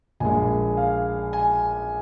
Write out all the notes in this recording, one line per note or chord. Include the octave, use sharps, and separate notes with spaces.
A#1 A#2 G#3 G#5
F5
G#5